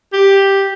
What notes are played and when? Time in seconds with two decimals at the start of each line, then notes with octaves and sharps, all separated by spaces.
0.13 G4